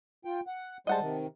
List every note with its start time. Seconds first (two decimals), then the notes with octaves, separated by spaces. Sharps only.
0.25 F4 G5
0.47 F#5
0.87 G3 G#3 C5 D#5 F#5 A5
1.00 C3 D#3